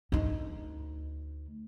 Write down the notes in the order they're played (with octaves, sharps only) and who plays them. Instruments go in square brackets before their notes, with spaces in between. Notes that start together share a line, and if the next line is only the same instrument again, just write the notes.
[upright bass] D2 D#4